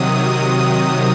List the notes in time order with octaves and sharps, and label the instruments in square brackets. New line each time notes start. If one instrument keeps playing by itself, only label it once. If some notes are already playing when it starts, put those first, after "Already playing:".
Already playing: [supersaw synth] C3 D#3 F#3 D#6